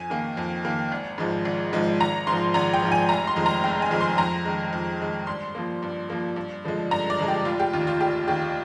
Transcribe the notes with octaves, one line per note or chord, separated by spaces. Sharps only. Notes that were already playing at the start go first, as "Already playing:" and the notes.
Already playing: F2 G#5
D#3 A#3
F2
D#3 A#3
G#1
G#2 F3 G#3
G#1
G#2 F3 G#3
G#1 A#5
G#2 C6
F3
G#1 A#5
G5
G#2 F3
G#5
F1 A#5
C6
F2 D#3 G#3
A#5
F1 G5
G#5
F2 D#3 G#3
C6
F2 A#5
D#3 G#3
F2
D#3 G#3
G2 C6
F3 A#3
G2
F3 A#3
G2
D3 F3 G#3
G2 A#5
D5
D3 F3 G#3
G4
F1 F4
G4
D#2 D#3 F4
F4
F1 G4
D#2 D#3 G4